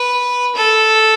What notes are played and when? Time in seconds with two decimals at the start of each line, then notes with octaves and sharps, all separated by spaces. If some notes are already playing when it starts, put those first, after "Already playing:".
Already playing: B4
0.55 A4